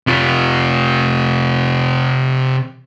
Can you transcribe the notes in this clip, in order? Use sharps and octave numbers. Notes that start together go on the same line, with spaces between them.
C3 F4